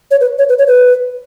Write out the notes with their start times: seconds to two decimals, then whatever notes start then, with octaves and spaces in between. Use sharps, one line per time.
0.11 C#5
0.21 B4
0.39 C#5
0.49 B4
0.59 C#5
0.67 B4